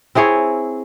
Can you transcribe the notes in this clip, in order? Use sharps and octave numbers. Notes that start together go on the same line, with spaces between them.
C4 E4 G#4 C#5